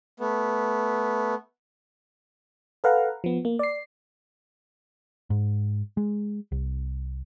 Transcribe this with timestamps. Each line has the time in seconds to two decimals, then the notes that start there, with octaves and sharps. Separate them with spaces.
0.20 A3 B3
2.84 A4 B4 F5 F#5 A#5
3.24 F3 B3
3.45 A#3
3.59 D5 C7
5.30 G#2
5.97 G#3
6.52 C2